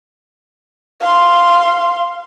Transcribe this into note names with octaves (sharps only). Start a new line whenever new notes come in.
F5 C6